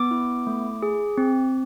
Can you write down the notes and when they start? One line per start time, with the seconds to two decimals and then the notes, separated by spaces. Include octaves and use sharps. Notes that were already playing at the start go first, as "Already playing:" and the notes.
Already playing: B3 D6
0.11 E4
0.47 A3
0.83 G#4
1.18 C4